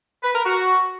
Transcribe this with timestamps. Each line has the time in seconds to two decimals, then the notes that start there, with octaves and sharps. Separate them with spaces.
0.23 B4
0.34 A#4
0.45 F#4